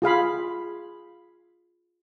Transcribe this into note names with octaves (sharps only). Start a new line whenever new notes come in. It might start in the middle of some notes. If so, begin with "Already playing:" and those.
F4 G#4 F5 B5